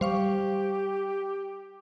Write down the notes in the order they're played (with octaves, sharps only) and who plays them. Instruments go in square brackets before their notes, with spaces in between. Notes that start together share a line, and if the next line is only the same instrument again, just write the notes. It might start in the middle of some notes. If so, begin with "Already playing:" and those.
[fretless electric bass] G3 [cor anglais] G4 [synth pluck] C5 F5 C#6